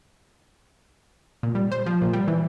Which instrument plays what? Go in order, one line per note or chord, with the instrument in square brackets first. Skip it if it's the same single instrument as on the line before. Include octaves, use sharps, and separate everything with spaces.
[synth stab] A#2
G3
C5
F3
A#2
G3
E3